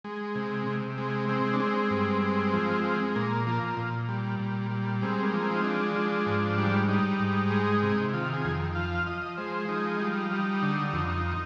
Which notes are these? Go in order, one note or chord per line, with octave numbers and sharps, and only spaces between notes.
G#3
C3
C3
G#3
G#3 C4
D4
G#3 C4
G2
G#3
F3
G#3
A#2 A#3
F3 A#3
A#2
G3
A#2
G3
G#3 C4
A#3
F3
C4
D#4
G#3 D4
F3
G#2
G3
G3 D#4
G#2
G#3
C3
D#3 F4
G#4
F2
F3 F5
F5
F3 D#5
D#5
G#3 C5
F3 D#4
G3 D#4
G3
D3
F2